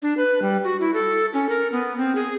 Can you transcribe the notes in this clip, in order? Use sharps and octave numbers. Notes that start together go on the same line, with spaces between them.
D4
B4
G3
F#4
E4
A4
C#4
A#4
B3
C4
G#4